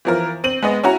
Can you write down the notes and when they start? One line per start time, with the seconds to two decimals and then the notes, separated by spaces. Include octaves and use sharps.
0.05 E3 F3 A#4
0.44 C4 D#7 F#7
0.62 G#3 B3 D#5
0.83 C#4 E4 F#4 A#5